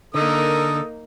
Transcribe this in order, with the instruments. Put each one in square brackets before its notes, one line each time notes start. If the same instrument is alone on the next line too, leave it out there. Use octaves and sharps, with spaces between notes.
[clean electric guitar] D3 [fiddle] A#3 D#4 [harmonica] A4 A#4 D#6